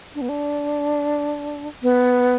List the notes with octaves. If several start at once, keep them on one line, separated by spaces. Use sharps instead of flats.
D4
B3
D4
B3